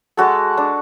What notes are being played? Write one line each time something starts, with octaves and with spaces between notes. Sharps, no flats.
G#3 F#4 A4
D4